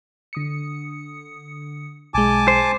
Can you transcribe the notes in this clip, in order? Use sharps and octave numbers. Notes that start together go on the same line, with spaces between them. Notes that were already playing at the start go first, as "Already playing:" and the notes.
D3 D#6 C#7
B1 G#3 G#5 A5 D6
C5